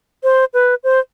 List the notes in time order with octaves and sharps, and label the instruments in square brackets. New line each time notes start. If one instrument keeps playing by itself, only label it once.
[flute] C5
B4
C5